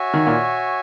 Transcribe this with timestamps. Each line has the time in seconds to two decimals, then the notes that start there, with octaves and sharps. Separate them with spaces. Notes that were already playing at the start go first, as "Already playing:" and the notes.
Already playing: F#4 C#5 E5 G#5
0.14 D#3
0.27 A#2